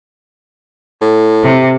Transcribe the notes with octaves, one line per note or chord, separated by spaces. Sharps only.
A2
C3